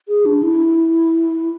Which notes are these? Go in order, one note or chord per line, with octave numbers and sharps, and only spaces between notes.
G#4
D4
E4